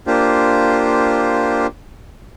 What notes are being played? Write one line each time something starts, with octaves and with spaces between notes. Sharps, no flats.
A#3 D4 F4 G4 C5